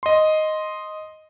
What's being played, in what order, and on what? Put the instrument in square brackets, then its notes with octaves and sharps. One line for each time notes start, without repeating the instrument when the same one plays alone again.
[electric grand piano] D#5 C6